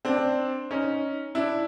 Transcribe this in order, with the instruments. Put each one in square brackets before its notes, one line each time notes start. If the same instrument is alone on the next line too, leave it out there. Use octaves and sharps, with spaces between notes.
[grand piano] C4 D4
C#4 D#4
D4 E4